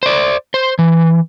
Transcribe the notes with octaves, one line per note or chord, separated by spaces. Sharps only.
C5 D5
C5
E3